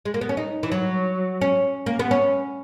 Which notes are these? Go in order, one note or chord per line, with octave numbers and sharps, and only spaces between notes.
G#3
A#3
B3
C#4
D#4
E3
F#3
C#4
A#3
B3
C#4